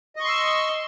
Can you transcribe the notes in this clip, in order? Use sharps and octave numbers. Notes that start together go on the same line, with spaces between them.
D#5 C6 C#6 E6